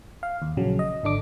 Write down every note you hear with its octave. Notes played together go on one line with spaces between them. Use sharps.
F5
D#2
A#1 C#3 F#3
D#5
G#1 D3 D4 D6